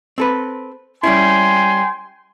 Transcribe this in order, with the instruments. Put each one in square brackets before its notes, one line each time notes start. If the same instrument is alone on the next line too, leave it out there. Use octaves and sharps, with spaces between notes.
[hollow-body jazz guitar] C4 A4 B4
[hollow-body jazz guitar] G3 C#4 E4 [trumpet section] G5 G#5 C6